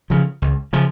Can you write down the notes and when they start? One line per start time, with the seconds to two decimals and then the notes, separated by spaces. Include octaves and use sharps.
0.10 C#3 F3
0.42 C#2
0.73 C#3 F3